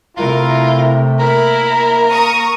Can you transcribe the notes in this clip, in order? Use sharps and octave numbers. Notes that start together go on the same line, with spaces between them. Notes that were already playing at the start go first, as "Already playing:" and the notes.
C3 A3 E4 F4 A#4
A#3 E4 A#4 B5
A#5 C#6 D#6